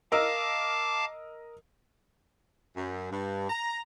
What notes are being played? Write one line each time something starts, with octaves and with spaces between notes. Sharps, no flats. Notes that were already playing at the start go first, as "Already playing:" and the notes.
A#4 D#5 F5 A5 D6 E6
F#2
G2
A#5